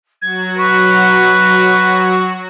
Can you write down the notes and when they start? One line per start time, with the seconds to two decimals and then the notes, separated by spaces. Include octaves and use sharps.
0.21 F#3 F#4 G#6
0.58 B4 C#6